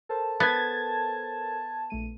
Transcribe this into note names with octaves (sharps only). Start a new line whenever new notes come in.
A4 A#4 C5 A5
B3 G#6 A6
A#1 A3 D#7